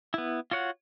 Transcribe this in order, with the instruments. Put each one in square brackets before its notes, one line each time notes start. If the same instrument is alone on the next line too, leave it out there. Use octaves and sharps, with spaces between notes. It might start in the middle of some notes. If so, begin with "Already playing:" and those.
[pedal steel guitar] B3 E4
F4 F#4 C#5 F#5